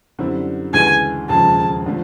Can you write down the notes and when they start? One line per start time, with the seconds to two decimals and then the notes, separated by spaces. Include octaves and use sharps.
0.19 F#2 D3 G3 C4 E4
0.73 D2 C#3 E3 G#3 G#5
1.29 E1 D#2 C#3 F3 A5
1.86 D3 F3 A3